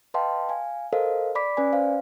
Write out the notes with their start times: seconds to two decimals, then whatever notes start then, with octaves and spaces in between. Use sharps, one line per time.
0.14 B4 D#5 F5 G5 A5 C6
0.49 F5 G#5
0.93 A4 A#4 C5 D#5 F5
1.35 D5 B5 D6 B6
1.57 C#4 B4 D5 G#5
1.73 C5 F5